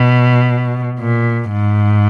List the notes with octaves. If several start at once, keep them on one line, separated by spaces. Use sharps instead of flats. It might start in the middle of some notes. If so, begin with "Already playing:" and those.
Already playing: B2
A#2
G#2